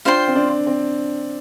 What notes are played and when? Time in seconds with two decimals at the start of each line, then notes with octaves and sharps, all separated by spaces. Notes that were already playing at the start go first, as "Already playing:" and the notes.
0.05 D4 F4 C5 G5 C6
0.28 C4
0.36 D4
0.67 C4